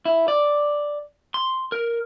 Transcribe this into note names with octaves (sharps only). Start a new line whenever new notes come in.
E4
D5
C6
A#4